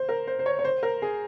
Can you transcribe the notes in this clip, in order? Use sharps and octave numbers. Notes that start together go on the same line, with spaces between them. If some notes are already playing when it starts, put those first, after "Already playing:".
Already playing: C5
A#4
C5
C5
C#5
C#5
C5
A#4
G#4